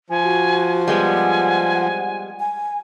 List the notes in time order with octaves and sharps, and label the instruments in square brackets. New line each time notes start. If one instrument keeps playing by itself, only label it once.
[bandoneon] F3 [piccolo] G#5
[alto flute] F#4
[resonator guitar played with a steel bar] G3 G#3 B3 [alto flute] F#5 [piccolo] G#5
[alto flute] G#5